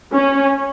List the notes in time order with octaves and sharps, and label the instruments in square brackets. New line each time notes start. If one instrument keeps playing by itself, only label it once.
[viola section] C#4